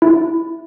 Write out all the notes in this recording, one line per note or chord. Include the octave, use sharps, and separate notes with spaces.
E4